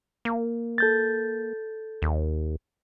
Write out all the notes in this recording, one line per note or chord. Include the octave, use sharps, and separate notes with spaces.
A#3
A4 G6 A6
D#2